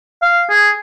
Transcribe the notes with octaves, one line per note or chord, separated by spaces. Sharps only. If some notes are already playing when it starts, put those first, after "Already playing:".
F5
G#4